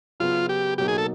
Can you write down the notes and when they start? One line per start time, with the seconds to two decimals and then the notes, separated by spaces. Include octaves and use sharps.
0.20 C#3 F#3 B3 F4
0.49 G4
0.78 B2 F#3 A#3 D#4 G4
0.88 G#4
0.98 A4